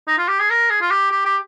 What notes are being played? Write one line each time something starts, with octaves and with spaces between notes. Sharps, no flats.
D#4
F4
G4
G#4
A#4
G#4
F4
G4
G4
G4